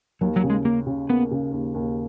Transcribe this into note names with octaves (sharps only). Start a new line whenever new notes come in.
D#2 F#3
F#3
C#3
G#3
C#3 A#3
C#3
A#3 B3
C#3
D#2
D#2